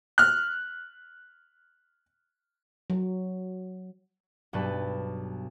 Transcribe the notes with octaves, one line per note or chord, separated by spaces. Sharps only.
F6 F#6
F#3
B1 G2 B4 A5